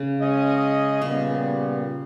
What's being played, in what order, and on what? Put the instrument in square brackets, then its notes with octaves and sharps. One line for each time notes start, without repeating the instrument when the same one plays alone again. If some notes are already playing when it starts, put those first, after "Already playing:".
Already playing: [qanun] C#3
[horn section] G#3 C#4 G#4 D#5
[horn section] A#2 G3 B3 [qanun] C#3